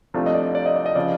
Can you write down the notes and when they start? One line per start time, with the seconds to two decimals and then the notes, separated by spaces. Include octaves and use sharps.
0.14 C2 C3 F3 A3 D4
0.26 D#5
0.34 D5
0.55 D5
0.66 D#5
0.76 D5
0.86 D#5
0.96 C#3 F3 D5